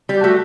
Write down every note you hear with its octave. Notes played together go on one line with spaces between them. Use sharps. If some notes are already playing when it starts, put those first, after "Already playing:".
G3
G4
A3 F#4